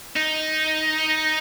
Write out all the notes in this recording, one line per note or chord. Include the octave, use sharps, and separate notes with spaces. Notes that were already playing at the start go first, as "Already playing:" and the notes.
D#4